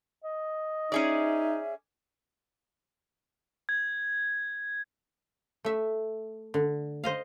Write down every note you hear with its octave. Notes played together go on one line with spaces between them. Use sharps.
D#5
C#4 D#4 G#4 D5 E5
G#6
A3 E5
D3
C5 D#5 F5